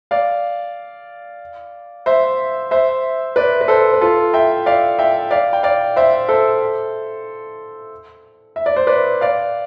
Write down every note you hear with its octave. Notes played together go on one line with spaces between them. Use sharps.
D5 F5
C5 E5
C5 E5
B4 D5
B4
A4 C5
B4
F4 A4
E5 G5
D5 F5
E5 G5
D5 F5
G5
D5 F5
C5 E5
A4 C5
E5
D5
C5
B4 D5
D5 F5